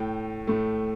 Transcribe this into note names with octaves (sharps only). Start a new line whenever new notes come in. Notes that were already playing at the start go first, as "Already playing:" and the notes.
Already playing: A2 A3 G5
A2 A3